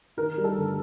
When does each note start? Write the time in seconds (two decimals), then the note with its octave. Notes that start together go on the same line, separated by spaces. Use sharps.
0.17 D#3 A#4
0.37 G3
0.44 A4
0.57 G1